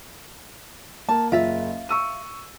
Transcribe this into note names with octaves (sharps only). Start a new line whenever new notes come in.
A#3 A5
F#1 F4 E5
C#6 E6 D#7